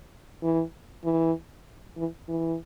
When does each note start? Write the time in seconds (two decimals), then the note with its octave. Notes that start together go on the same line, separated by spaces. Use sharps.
0.43 E3
1.04 E3
1.97 E3
2.28 E3